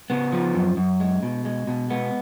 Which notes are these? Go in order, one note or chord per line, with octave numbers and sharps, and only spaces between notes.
C#3 B3
F3
F#2
F#2
G#3
B2
G#3
B2
G#3 B3